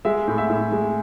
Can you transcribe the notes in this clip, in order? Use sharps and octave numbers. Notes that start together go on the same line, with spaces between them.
G#3 E5
A2
E5
A2
G#3